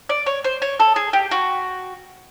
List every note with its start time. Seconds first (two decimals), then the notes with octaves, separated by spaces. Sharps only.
0.09 D5
0.26 C#5
0.44 C5
0.62 C#5
0.80 A4
0.96 G#4
1.13 G4
1.31 F#4